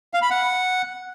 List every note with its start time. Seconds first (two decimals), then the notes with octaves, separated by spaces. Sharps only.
0.14 F5
0.22 B5
0.30 F#5